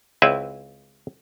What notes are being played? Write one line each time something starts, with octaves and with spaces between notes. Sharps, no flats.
C#2 C4 E4 B4 E5